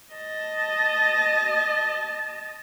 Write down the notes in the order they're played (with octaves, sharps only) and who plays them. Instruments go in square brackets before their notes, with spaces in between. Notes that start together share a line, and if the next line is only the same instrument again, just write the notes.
[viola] D#5 A5